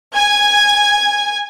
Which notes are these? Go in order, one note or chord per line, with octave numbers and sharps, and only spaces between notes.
G#5 G#6